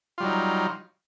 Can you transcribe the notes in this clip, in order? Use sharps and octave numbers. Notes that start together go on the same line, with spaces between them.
F#3 G3 D#4 F4